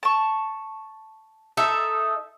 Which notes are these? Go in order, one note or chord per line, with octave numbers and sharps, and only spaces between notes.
A5 C#6
D#4 A4 E5